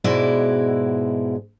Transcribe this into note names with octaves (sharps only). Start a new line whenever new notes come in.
G#2 B2 G#3 E4 F#4 D5